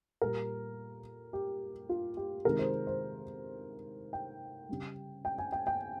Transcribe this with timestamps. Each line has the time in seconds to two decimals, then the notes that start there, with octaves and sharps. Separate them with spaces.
0.22 A#2 G3 A#4
1.33 G4
1.89 F4
2.17 G4
2.45 C3 D#3 G#3 A#4
2.59 C5
2.87 C5
4.13 G5
4.69 C#3 G3
5.25 G5
5.38 G#5
5.52 G5
5.67 G5